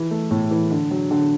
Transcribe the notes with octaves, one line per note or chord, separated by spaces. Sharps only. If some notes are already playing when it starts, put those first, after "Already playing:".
Already playing: E3
A3
A2
E3
D3
F#3
D3